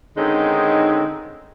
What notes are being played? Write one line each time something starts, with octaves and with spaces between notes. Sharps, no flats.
D3 D#3 G#3 C4 C#4 D#4